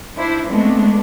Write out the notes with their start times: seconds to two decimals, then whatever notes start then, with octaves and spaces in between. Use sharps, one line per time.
0.16 D4 E4 C5
0.49 G#3 A3 B3 C4 D4